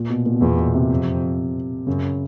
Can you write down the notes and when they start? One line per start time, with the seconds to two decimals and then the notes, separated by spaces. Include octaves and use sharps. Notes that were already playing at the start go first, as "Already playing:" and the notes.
Already playing: A#2
0.10 B2
0.26 A#2
0.34 B2
0.41 E2 A#2
0.58 B2
0.74 C3
0.90 F2
1.87 F#2 C#3